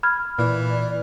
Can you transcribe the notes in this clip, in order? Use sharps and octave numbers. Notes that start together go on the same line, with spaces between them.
B5 F6 G#6
A#2 E3 D5